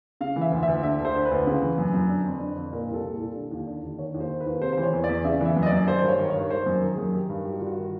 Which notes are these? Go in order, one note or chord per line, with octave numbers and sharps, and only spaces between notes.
C#3 F5
E3
E5
D2
E5
D2
D3 E5
D2
C5
D3
B4
D2
C#3
E3
F#2
F#2
D3
F2
D3
F2
A#2 A#4
C2
A4
A#2
A4
C2
D3
D#2
D3
D#2
D#3 C#5
D#2
C5
D#3
B4
D#2
C3 C5
E3 C5
C#5
E2
D5
E2
C#3 E5
E3 E5
F#2
D#5
D5
F#2
D#3 C5
G2
C#5
D#3
C#5
G2
D#3 C5
F#2
D#3
G#4
F#2
D#3 G4
G2
D#3 G4
F#4
G2 F4
F#4
D#3